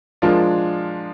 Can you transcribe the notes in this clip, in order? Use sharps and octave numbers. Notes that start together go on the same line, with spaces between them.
F3 G#3 D4 F4 A#4